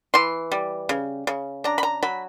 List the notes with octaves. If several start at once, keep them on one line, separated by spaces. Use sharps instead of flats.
E3 C6
G3
C#3
C#3
D4 A#5
B5
A#5
F#3 B5